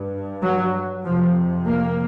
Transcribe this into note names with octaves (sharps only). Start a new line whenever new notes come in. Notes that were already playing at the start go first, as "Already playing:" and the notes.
Already playing: G2
F#3
F2 C3 F3
A#3